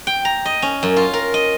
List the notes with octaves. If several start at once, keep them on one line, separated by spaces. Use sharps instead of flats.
G5
A#5
D#5
C#4
F#2
F4
A#4
D#5